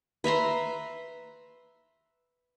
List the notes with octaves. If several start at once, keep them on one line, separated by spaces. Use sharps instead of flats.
B4 E5 A#5 C6